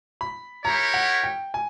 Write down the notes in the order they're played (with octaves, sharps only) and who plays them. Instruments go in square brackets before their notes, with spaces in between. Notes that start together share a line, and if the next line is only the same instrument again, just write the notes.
[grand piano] B5
[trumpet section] E4 G4 A#4 C#5 [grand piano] A#5
[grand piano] F#5
G5
G#5